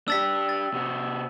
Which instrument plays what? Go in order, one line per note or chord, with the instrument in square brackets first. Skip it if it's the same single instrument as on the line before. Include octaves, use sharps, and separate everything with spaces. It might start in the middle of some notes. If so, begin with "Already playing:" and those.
[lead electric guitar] D4 G4 [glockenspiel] E6 A6 B6
[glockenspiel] A6
[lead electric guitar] C3 F#4